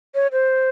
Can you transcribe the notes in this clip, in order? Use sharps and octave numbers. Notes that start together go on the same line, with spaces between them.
C#5
C5